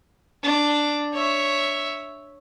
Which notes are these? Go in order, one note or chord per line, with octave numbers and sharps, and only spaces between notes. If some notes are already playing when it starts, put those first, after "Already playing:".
D4
C#5 E5